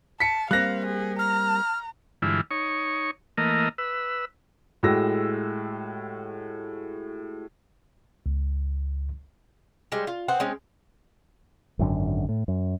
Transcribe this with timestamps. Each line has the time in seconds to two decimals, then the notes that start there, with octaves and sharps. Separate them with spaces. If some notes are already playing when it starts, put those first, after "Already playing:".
0.20 A5 B6 C#7
0.51 G3 A#3 C4 F5 F#6 A#6
0.86 G#4
1.19 A#5 F6
2.22 G2 D3 E3 G#3 E4 F4
2.51 D#4 C#5 C#6
3.38 E3 A3 A#3 A#4 D#5
3.78 B4 E6
4.83 A2 G#3 F#4 G4 E6 A#6
8.26 C#2
9.92 G3 G#3 C5
10.07 F4
10.28 B3 C4 C5 F#5
10.40 G#3 C4 C#4
11.79 G#1 F#2 D3
12.29 A2
12.48 F#2